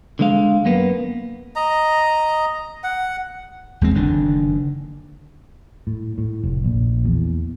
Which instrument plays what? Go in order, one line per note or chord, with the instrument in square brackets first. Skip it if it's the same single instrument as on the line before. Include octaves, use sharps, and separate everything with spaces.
[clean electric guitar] D3 G#3 F5
F#2 A#3 B3
[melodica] D#5 A#5
F#5
[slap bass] E2 G#3 C4
F#1 D3 D#3 D4
[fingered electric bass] A2
A2
F1
A#1
E2